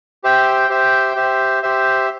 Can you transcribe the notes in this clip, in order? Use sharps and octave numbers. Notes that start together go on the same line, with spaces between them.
G4 C5 E5 G5
G4 C5 E5 G5
G4 C5 E5
G4 C5 E5